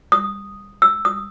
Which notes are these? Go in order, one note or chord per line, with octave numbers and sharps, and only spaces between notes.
D#6
E6
D#6